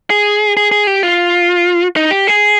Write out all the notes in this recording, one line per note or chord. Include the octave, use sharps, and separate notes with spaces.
G#4
G#4
G#4
G4
F4
D#4
G4
G#4